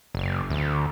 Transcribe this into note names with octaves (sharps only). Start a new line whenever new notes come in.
F#1
D2